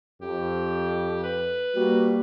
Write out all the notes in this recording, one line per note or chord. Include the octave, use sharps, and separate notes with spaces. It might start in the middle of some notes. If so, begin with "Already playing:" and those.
F2 G4
B4
G3 A#3 F#4